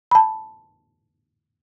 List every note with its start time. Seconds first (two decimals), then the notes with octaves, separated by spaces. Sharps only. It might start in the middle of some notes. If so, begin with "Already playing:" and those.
0.11 A5 B5